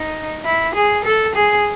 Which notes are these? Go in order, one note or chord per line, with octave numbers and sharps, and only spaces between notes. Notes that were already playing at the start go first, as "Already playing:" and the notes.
Already playing: D#4
E4
G#4
A4
G#4